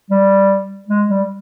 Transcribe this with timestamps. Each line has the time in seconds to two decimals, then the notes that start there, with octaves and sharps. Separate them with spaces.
0.10 G3
0.88 G#3
1.09 G3